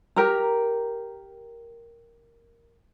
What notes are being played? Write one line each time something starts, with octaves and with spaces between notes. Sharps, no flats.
G4 A#4 A#5